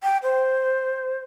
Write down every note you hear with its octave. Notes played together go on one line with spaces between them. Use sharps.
G5
C5